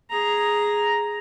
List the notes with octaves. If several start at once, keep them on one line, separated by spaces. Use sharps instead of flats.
G#4 A#5